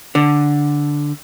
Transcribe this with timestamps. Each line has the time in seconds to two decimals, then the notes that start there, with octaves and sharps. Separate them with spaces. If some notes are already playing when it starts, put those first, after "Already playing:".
0.15 D3